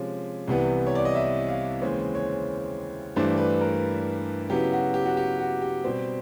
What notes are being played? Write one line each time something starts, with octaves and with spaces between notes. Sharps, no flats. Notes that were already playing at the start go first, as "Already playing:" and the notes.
Already playing: C3 F3 G#3 C#4
C2 C3 E3 G3 B3
C#5
D5
D#5
E5
F5
D#2 C#3 E3 G#3 C4 C#5
C#5
G2 E3 A3 D4 C5
B4
A#4
C#3 F#3 B3 E4 G4
F#4
G4
F#4
G4
F#4
G4
B2 G3 C4